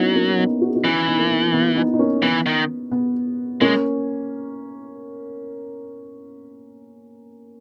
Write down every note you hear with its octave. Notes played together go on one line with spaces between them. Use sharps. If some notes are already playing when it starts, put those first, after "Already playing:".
Already playing: F#3 A#3 B3 C#4 D#4 E4
A#3 C#4
B3 D#4
F#4
G#4
D#4 F#4
E3 C#4 E4
B3 D#4
A#3
B3
B3
E4
B3 D#4
D#4
A#3 C#4
E3 B3
D#3
B3
G#3 A#3 C#4